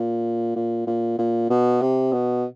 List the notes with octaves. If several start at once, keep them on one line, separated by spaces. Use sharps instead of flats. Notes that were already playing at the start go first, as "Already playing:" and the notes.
Already playing: A#2
A#2
A#2
A#2
B2
C3
B2